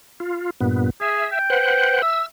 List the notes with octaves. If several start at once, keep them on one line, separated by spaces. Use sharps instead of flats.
F4
G2 A#2 B3
G#4 E5
G5
B4 C5 F#5
E5 E6